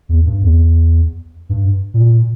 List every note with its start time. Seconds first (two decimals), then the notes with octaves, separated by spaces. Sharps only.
0.09 E2
0.26 G2
0.42 E2
1.49 G2
1.94 A#2